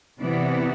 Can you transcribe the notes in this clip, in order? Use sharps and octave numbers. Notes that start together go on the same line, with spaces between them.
C3 E3 B3 D5